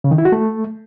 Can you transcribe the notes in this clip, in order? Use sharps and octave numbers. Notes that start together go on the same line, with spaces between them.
C#3
D#3
E4
F#4
A3